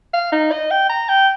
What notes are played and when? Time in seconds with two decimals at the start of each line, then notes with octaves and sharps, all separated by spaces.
0.14 F5
0.32 D#4
0.52 D#5
0.71 G5
0.90 A#5
1.09 G5